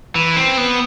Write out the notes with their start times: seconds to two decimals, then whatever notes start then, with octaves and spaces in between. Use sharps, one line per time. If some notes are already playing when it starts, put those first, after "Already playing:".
0.15 E3
0.36 C4
0.57 B3